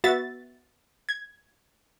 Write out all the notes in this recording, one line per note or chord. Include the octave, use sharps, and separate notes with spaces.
B3 F#4 E5 A6
G#6